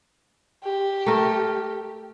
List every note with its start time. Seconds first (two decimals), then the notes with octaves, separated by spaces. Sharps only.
0.64 G4
1.06 A3 A#4